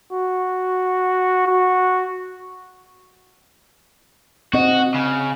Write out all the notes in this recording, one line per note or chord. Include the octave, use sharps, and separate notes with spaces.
F#4
F#4
C4 F#4 D#5
C#3